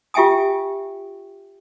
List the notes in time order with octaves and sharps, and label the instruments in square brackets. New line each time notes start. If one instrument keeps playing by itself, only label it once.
[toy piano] F4 G4 E5 G5 G#5 D#6